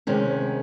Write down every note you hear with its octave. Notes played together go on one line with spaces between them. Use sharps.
D2 C3 D#3 G#3 C#4